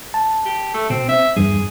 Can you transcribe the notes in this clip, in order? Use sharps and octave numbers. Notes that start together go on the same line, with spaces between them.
A5
G4
A3
B2 C4
C4 E5
E2 G2 G#4